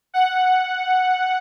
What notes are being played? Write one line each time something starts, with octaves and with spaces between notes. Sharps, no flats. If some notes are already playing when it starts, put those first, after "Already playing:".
F#5